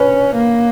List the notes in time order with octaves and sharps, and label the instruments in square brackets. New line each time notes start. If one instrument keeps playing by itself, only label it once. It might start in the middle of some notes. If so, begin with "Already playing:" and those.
Already playing: [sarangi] C#4 [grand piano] B4
[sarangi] A#3